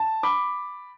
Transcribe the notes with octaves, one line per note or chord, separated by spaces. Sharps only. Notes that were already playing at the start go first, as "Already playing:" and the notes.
Already playing: A5
B5 D6